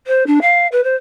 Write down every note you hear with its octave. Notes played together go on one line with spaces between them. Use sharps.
C5
D4
F5
B4
C5